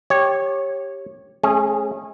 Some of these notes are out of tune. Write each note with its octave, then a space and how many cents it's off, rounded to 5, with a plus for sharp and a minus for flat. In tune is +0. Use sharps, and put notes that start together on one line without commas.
G4 +0 C#5 -15
A3 -40 C#4 -35 G#4 +0